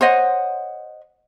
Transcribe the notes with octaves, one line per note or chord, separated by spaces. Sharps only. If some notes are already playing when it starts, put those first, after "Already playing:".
C5 C#5 D#5 F#5